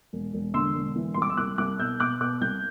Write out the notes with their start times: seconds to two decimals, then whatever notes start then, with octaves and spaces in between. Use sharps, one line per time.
0.13 E1
0.34 E1
0.54 D3 C6 E6
0.75 E1
0.96 E3
1.14 C2 C6
1.22 D6
1.30 E6
1.37 C2 D6 F#6
1.58 C2 D6 F#6
1.79 B2 E6 G6
2.00 B2 D6 F#6
2.21 B2 D6 F#6
2.41 C2 G6